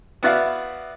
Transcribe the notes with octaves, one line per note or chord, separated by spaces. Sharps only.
B3 E4 F#4 D5 E5 F5